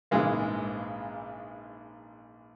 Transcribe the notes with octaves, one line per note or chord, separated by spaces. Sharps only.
A#1 G#2 C#3 E3 G#3 A#3